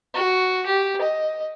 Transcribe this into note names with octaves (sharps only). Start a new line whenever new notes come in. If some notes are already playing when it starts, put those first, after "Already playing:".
F#4
G4
D#5